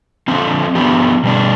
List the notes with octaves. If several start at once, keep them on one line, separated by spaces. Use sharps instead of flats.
D3 F3 C4
F3 B3 D4 G4
B2 G3 D4